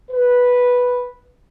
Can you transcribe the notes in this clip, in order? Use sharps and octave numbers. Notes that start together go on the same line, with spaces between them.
B4